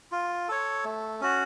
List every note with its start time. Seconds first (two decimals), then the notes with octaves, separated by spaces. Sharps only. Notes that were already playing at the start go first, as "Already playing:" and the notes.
0.12 F4
0.48 A4 C#5
0.84 A3
1.21 C#4 F#4